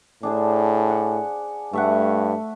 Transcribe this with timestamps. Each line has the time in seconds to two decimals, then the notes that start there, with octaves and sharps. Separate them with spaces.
0.23 A2 D4 G#4 C5
0.89 F#5
1.73 G2 A3 E5 F#5